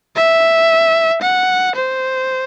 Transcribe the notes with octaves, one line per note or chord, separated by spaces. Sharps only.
E5
F#5
C5